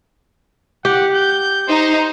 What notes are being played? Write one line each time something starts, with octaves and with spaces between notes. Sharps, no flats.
G4 F#5
G6
D#4 C5